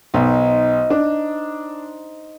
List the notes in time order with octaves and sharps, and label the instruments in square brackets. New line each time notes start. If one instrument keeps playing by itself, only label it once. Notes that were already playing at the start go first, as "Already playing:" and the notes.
[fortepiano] B1 [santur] D#4 C5
[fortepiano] D4